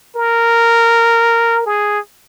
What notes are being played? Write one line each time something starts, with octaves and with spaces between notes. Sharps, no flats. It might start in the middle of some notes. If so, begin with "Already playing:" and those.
A#4
G#4